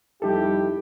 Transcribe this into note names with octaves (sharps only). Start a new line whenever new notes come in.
F2 G3 D#4 E4 G4 A4